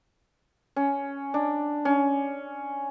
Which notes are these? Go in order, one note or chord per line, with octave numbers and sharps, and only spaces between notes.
C#4
D4
C#4